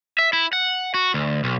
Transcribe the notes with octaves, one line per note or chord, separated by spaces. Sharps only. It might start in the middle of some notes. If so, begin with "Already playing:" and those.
E5
E4
F#5
F#4
D2
B1